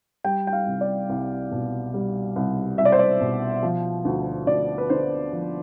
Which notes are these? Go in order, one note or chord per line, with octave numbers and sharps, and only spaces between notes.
G3 G5
G5
F5
C2
D5
C2
B2
G3
C2
C2 E5
D5
C5
D5
B2
F3
D2
D2 D5
B4
D3 C5
F3